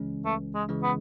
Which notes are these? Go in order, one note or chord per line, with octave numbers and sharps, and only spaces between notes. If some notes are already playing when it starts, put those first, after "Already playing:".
Already playing: C#2 C#3 E3 G#3 C#4
C#2 A3
G#3
C#3 E3 G#3 C#4
B3